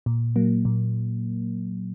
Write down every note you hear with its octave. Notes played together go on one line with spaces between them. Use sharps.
A#2
F#3 A#3
A#2